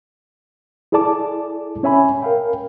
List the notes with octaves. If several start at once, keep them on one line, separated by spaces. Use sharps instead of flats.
E4 G#4 A4 D5 A5 D6
C#4 C#5 E5 G#5 B5
A#4 F5 G5